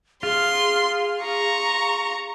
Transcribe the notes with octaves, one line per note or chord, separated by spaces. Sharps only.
F4 G#4 C6
A#5 C#6